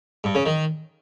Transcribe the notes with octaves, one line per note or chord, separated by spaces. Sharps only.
G2
C#3
D#3